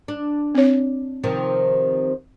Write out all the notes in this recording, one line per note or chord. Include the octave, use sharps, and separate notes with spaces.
D4
C4 C#5
C3 D#3 F3